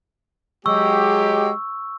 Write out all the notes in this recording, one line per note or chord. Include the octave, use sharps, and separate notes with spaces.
F#3 G#3 G4 C#6 E6